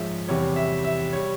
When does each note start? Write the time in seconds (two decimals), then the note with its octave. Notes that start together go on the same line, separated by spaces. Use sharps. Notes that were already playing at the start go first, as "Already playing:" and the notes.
Already playing: G#2 F3 G#3 C#5 E5
0.28 E2 C3 E3 G3 C#5
0.56 E5
0.84 E5
1.13 G3 C#5